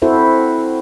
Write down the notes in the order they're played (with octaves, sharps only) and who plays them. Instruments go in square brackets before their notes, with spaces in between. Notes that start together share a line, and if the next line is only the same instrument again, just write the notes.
[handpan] C4 E4 F#4 A4 C5